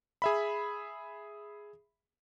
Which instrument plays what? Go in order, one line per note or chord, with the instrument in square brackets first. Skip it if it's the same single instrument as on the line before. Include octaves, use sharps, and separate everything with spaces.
[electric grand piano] G#4 E5 B5